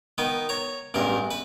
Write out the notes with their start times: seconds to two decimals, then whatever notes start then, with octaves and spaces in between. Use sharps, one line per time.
0.18 D#3 B3 B4
0.49 C#5 A#5
0.94 A1 E2 G2 A#4
1.31 B4